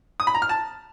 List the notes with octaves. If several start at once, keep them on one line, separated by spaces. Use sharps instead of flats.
D#6
B5
A#5
F6
A5